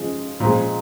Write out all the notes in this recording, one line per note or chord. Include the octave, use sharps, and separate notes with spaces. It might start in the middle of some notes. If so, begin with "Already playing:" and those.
Already playing: C#3 F3 G#3
A#2 F3 G#3